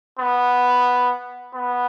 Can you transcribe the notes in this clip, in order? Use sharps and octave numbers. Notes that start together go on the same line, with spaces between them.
B3
B3